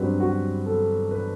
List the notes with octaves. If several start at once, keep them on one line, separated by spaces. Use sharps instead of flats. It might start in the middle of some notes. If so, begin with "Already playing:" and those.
Already playing: G2 F#3 C4 B4
F#4
A4
B4